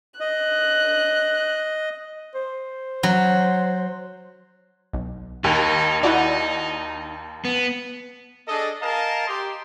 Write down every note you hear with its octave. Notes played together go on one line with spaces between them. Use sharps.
D#5 F#6
C5
F#3
B1
D#2 D#4
D#4 E4 F#4 D5
B3
D4 G#4 A4 D#5
A#4 D#5 F5 G#5 A5
G4 C6